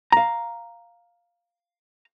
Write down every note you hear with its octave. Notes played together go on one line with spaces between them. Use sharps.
F5 A#5